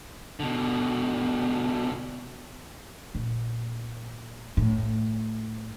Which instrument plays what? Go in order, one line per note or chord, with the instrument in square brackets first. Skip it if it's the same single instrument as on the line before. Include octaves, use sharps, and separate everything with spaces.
[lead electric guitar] B2 D3
[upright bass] A#2
A2